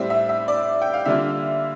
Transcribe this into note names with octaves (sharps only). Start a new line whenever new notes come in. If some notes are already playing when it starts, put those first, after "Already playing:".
Already playing: A2 G3 C4 E5
E5
E5
D5
G5
F5
D3 G3 A#3 F4 E5